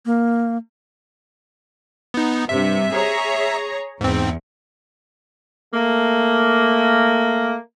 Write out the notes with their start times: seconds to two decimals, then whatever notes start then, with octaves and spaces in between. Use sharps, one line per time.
0.06 A#3
2.14 B3 D#4
2.49 G2 C3 E5
2.92 G#4 C#5 A#5
4.01 E2 G#2 C4
5.74 A3 A#3